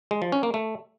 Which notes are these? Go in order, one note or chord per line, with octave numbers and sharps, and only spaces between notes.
G#3
F3
C#4
A#3
A3